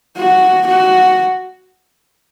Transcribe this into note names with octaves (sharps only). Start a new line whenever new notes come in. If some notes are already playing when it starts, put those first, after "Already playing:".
F#4
F#4